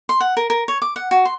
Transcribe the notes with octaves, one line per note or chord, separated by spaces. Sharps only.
C6
F#5
A#4
A#4
C#5
D6
F#5
F#4
C6